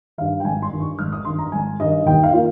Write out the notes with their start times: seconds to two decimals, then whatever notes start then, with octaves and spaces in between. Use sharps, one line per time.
0.18 G2 D#3 F5
0.40 G5
0.44 G#1 G#5
0.62 C6
0.72 G2 D#3
0.80 C#6
0.99 G#1 F6
1.12 D#6
1.25 G2 D#3 C6
1.39 A#5
1.52 G#1 G#5
1.80 G2 D#3 D#5
2.06 D#2 G5
2.23 F5
2.33 D#3 A#3 F4